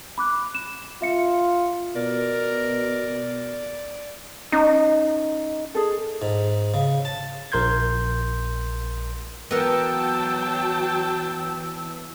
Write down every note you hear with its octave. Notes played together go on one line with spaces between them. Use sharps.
B5 D6 F#6
E7
F4 E5 C#7
B2 A#4 D5
C#4 D#4
G#4 A4
G#2
C#3
A5
A#1 A#4 C6 G6 G#6
E3 F#3 B3 A#4 G5 A5 E6